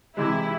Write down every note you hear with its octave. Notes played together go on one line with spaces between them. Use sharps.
C3 E3 G#3 E4